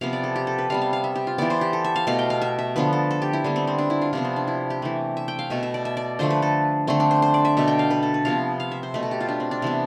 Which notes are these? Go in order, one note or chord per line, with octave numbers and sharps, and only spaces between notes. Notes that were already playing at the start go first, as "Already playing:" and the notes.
C3 F3 B3 F5
D5
A4
G4
A4
B4
C3 G3 B3 F5
F5
F5
E5
G4
F4
E3 B3 D5
C5
G4
A4
E5
F5
B2 A3 F5
G5
F5
E5
E5
D3 F3 B3 B4
A4
A4
G4
E4
D3 G3 B3
C4
C4
D4
E4
F4
C3 F3 B3 D4
C4
D4
E4
G4
E3 A3
E5
G5
F5
B2 A3 E5
E5
D5
E5
D5
D3 F3 A3 C5
B4
A4
D3 A3 C4
D4
C5
C5
D5
E5
B2 A3 E5
G5
F5
B4
A4
B4
C3 F3 B3 F5
F5
E5
C5
B2 A3 B4
A4
G4
F4
D4
C4
D4
C3 E3 B3